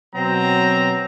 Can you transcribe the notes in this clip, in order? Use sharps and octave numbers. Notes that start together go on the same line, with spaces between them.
B2 F#3 C4 A#5